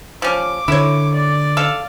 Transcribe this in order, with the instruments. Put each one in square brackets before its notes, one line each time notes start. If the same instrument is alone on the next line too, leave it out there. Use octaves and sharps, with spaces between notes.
[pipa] F3 C#4 [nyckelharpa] D6
[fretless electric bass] D3 [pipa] E4 C#5
[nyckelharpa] D5
[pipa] A4 F5